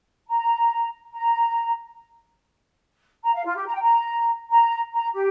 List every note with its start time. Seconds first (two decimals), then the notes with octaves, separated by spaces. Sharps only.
0.28 A#5
1.13 A#5
3.23 A#5
3.34 F5
3.45 F4
3.56 G4
3.66 A#5
3.74 G5
3.82 A#5
4.51 A#5
4.93 A#5
5.14 G4